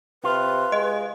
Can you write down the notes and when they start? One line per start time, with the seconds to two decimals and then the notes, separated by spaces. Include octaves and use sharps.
0.24 C3 F4 B4
0.72 G#3 D#5